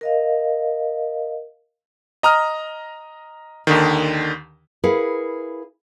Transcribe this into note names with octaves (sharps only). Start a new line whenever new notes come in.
A#4 D#5 F5
D#5 A#5 D#6 F6
D#2 D3 D#3
E4 G#4 A#4 B4 F5 F#5